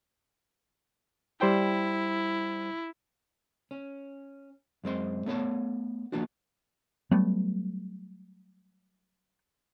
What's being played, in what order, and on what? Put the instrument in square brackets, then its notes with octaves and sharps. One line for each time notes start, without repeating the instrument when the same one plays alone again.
[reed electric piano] G3 C5 G5 [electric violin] E4
[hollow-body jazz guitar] C#4
F#2 G#3 C4 C6
A3 B3 C#5 A5
F3 A#3 B3 D4 F#4
[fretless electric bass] F#3 G3 A3 B3